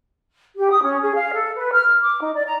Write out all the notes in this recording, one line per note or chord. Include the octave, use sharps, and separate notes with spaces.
G4
D#6
C#4
G#4
F5
A4
B4
F6
D6
D#4
D5
A#5